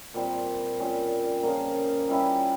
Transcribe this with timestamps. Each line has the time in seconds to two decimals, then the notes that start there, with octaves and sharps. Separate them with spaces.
0.14 A#2 G3 C4 G4
0.79 A#2 G3 C#4
1.43 C#3 F3 A#3
2.09 G3 C#4 E4 G4